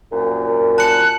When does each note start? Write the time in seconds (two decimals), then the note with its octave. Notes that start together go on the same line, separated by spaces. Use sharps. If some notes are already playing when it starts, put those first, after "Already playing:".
0.10 C2 F#2 A#2
0.78 A5 F#6 C#7